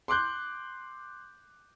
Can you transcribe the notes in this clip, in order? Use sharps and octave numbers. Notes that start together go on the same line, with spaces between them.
C6 D6 F#6 G6